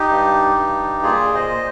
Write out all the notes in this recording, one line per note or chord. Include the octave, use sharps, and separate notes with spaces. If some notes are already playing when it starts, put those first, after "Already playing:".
Already playing: D#4 G4
G2
G2
A#2 F4 G#4
C5 D#5
A#2